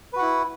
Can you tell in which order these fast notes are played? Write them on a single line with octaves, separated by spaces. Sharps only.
B4 F#4 F#5 E4